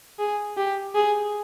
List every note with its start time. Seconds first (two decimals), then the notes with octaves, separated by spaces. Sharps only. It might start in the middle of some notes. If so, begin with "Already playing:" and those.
0.19 G#4
0.57 G4
0.95 G#4